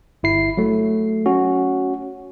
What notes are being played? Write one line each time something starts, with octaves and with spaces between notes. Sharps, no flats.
G1 E4 C7
F#3 A3
C#4 F#4